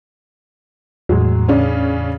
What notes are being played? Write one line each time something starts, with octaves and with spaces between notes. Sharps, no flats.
E2 A2 F#3 G#3
C#3 C#4 D4